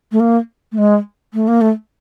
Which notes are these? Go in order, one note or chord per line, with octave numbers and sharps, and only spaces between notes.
A3
A#3
A3
G#3
A3
A#3
A3